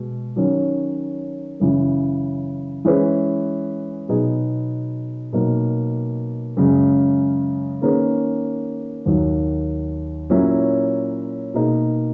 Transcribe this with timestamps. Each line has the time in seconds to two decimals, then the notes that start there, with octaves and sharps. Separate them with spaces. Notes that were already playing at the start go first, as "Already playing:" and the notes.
Already playing: B2 G#3
0.36 D#3 F#3 C#4
1.60 F#2 C#3 E3
2.85 E3 G#3 C#4 G#4 B4
4.09 B2 F#3 B3 D#4 G#4
5.33 B2 F#3 A#3 D#4
6.57 F#2 C#3 G#3
7.81 D#3 A#3 C#4 G#4 B4
9.06 D#2 D#3 F#3
10.30 A#2 F#3 A#3 C#4 E4
11.54 B2 A#3 D#4 G#4